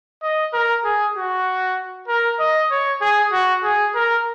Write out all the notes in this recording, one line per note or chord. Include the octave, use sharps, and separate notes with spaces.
D#5
A#4
G#4
F#4
A#4
D#5
C#5
G#4
F#4
G#4
A#4